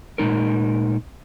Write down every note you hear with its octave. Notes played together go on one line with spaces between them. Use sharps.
A#2 G#3 D#4 A#4